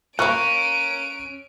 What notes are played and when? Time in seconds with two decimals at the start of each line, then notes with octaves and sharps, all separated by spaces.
0.19 A#3 C#4 A#4 C#6 F#6 D7